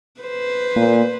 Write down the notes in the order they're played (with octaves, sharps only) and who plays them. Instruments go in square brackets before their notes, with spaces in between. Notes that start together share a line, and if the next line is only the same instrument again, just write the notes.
[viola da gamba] B4 C5
[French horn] A#2 [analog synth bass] A#3